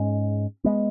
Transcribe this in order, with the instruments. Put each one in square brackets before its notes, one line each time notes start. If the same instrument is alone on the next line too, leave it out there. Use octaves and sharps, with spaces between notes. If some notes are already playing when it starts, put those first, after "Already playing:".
Already playing: [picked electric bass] G#2 G#3 C#4
G#3 B3